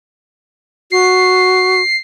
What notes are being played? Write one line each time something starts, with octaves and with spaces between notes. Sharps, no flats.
F#4 C7